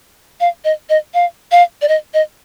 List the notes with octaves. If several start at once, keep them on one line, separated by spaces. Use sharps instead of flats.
F5
D#5
D#5
F5
F5
D5
D#5
D#5